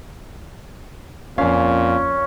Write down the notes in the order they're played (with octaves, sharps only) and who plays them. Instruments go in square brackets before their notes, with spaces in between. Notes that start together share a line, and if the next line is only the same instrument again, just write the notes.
[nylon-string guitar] F2 F5 [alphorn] A#2 [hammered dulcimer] C#4